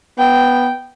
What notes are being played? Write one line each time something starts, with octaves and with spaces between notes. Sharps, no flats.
B3 G5